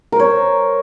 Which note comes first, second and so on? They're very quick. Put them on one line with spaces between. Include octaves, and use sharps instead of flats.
A#4 C5 C#5